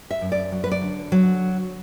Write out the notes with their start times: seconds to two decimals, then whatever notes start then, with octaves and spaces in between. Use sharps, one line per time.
0.11 E5
0.21 F#2
0.32 D5
0.52 F#3
0.64 B4
0.71 D5
0.81 D3
1.12 F#3